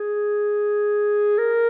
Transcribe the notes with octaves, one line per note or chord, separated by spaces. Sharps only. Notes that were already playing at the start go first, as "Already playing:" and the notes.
Already playing: G#4
A#4